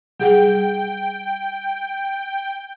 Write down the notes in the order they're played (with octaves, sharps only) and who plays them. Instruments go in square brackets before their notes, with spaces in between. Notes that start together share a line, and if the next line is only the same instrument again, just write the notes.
[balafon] G3 G#4 F#5 [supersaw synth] G5